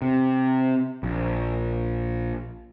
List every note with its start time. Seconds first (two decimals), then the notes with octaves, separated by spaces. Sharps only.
0.02 C3
1.03 A#1